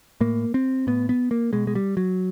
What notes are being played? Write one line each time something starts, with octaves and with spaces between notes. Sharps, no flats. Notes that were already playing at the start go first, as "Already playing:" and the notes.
A2 A#3
C4
A2 B3
B3
A#3
B2 G#3
G#3
G3
F#3